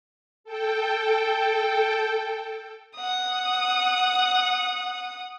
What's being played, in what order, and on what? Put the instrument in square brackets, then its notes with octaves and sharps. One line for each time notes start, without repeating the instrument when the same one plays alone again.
[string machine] A4 G5
[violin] F#5 D#6